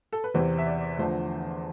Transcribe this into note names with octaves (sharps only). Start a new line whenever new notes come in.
A4
B4
E2 C3 E3 C5
E5
D5
E2 D3 F3 A3 C5